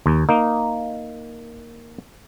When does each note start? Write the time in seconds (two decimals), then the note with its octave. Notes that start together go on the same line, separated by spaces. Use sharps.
0.06 D#2
0.29 A#3 D#4